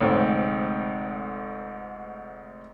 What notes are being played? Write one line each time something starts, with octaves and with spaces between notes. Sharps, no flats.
F1 D2 G#2 C4 C#5